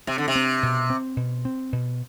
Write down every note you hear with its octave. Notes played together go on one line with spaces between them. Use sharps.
C3 C4
D3
C3
C4
B2
C4
B2
C4
B2